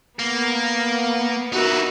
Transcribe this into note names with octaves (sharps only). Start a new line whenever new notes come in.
A#3 B3
D#4 E4 F#4 A#4